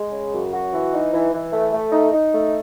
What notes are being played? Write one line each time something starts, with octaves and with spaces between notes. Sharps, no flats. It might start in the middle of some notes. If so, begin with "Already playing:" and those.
Already playing: G#3
C#3
F#2
F#4
E3
D#4
E3
E3
A3
A3
D#4
D#4
A3